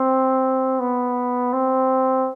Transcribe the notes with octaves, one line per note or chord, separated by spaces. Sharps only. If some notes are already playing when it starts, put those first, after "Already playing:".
Already playing: C4
B3
C4